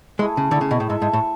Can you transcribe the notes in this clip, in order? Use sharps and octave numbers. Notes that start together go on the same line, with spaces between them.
G#3 A3 E4 G#4
C#3
D3 A3 E4 G#4
C#3
B2
A2
G#2 E4 A4 E5
G#2
A2